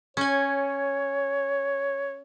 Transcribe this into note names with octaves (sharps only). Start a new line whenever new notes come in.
C#4 C#5 G#5